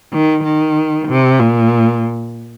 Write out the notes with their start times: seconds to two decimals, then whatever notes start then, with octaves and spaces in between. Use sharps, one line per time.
0.13 D#3
0.44 D#3
1.08 C3
1.40 A#2